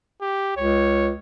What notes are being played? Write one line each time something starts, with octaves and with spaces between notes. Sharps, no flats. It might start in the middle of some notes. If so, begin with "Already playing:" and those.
G4
C#2 C#5